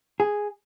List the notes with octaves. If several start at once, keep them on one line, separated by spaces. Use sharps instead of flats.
G#4